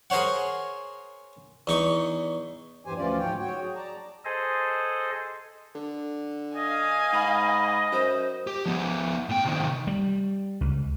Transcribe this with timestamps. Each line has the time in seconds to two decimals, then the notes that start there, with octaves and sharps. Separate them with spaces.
0.10 G#4 A#4 C5 C#5 F#5
1.67 E2 D#4 C#6
2.85 E2 G2 E3 G4 C5 G#5
2.97 D2 E3 F3 C#4 F4 D5
3.19 G#2 F3 C#5 G5
3.40 F#3 F#4 C#5 G5
3.62 G#4
3.76 D5 A5 A#5
4.25 G#4 A4 C5 D#5 G#5
5.75 D3
6.56 D#5 F5 G#5
7.13 G#2 B5
7.92 F#2 C5
8.47 G4
8.66 F3 B3
9.29 A2 G5
9.45 C3 D#3
9.87 G3
10.61 C#2